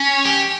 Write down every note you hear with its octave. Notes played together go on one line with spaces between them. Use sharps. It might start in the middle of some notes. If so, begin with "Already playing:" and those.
Already playing: C#4
G4